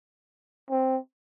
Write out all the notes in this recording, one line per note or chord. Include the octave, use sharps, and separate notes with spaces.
C4